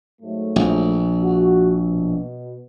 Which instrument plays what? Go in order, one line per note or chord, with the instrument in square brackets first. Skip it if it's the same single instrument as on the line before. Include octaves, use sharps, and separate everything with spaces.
[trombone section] G#2 F#3 A3
[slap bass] A#1
[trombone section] F#4
B2